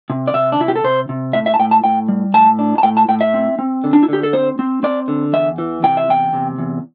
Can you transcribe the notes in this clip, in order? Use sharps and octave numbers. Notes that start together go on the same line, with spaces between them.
C3
D5
C3 E5
D4
C3 E4
G4
A4
C3 C5
C3
A2 E5
E5
A5
A2 G5
A5
A2 G5
G3
A2 A5
D4
A5
A2 G5
A5
A2 G5
E5
C4
C4
D3
D4
E4
D3 G4
A4
C4 C5
C4
C4 D5
D3
E2 E5
E3
C3 G5
E5
E2 G5
C3
E2